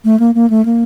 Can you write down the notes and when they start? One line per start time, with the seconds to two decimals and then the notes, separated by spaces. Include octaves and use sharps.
0.05 A3
0.20 A#3
0.35 A#3
0.50 A3
0.65 A#3